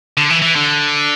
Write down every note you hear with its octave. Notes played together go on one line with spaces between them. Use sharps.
D3
E3
E3
D3